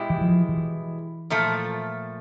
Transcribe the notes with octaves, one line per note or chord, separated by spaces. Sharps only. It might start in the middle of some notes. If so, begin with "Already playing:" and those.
Already playing: B2 G#3 E4 G4
E3
F3
E3
A#2 F3 A3